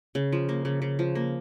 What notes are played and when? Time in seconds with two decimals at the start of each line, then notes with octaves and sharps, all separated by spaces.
0.15 C#3
0.32 F3
0.49 A#3
0.65 C#3
0.82 C#3
0.99 F3
1.15 A#3